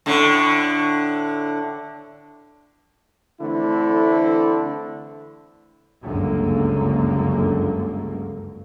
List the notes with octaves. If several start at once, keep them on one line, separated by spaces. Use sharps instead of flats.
A2 D3
D3 E3 A3 C4 E4
G1 C#2 F#2 D3 A#3